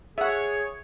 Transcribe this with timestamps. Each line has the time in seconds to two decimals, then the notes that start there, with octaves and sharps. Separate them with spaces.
0.18 G#4 C#5 E5 F#5